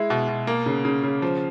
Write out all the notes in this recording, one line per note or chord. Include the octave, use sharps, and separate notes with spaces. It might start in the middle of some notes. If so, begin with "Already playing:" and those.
Already playing: G#3 E4
B2
B2
A#3
C#3
C#3
C#3
F3